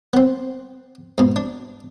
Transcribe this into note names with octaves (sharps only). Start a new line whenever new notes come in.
B3 C4
G#2 B2
D4